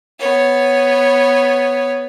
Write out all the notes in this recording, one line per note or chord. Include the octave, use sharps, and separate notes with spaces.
B3 C#5